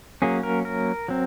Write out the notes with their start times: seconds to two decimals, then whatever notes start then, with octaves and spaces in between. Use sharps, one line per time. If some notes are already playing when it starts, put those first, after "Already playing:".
0.22 F#3 A#3 C#4 G#4
0.43 A#4
0.65 A#4
1.08 F#3 C4